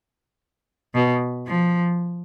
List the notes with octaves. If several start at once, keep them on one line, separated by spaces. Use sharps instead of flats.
B2
F3